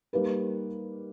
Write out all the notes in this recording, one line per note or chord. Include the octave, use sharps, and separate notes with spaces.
G3 A#3 D#4 G4 B4